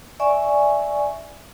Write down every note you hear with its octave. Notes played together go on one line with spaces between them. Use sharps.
D5 E5 G#5 C#6